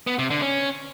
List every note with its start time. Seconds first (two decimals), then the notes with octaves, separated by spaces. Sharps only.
0.07 B3
0.19 C3
0.30 D3
0.42 C#4